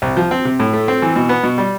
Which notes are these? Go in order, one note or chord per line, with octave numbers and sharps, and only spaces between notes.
C2
F3
C4
C3
A2
A3
C4
E3
B2
B3
B2
G3